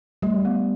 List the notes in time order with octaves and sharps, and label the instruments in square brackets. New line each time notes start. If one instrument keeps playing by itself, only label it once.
[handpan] G3 [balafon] A3
[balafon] B3